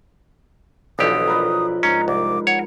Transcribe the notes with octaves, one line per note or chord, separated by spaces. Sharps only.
B1 B2 D3 E3 F3 G4 D#6
A#4 B4 D#5
G#2 C#4 A#5
C2 D6
C#5 F#5